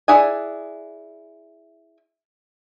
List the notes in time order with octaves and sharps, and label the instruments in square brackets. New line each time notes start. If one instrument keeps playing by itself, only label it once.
[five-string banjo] E4 G#4 D5 F#5 G#5